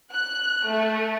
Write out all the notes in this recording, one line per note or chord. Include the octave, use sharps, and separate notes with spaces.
F#6
A3